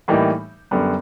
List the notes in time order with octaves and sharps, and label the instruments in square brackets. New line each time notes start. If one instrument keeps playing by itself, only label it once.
[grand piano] A2 E3 G3 A#3 D#4
F#2 D3 G3 B3